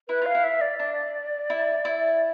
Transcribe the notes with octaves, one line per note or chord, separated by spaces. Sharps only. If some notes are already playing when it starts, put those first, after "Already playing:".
E4 B4
F4 F5
E4
E5
D5
D4 D5
E4
E4